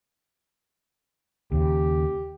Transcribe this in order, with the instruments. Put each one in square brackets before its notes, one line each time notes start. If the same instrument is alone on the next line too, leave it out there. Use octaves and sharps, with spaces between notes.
[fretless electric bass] D#2 C#3 [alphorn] G4